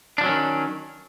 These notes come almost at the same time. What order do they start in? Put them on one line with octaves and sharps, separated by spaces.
D4 F3 F#3 C#4 D#3